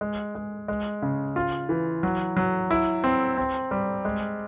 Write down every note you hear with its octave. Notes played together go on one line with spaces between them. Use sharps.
G#3
G#3
G#3
C#3
F4
E3
F#3
F#3
E4
C4
C4
G3
G#3